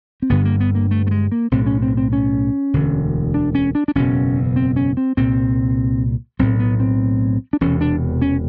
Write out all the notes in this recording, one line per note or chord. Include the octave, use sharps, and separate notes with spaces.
C4
G1 G2 D3 B3
A#3
B3
A#3
A3
A3
G#3
A#3
B1 A2 C4
C#4
C4
C4
C#4
E1 D2 D3
D4
C#4
D4
D4
F#1 E2 B2 C#4
C4
C#4
C4
C2 A#2 C4
B1 A2 C4
B3
C4
D4
E1 E2 C3 C#4
D4
C#4